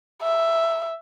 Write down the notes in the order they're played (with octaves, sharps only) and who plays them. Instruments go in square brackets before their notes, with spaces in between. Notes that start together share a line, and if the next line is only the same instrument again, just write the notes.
[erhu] E5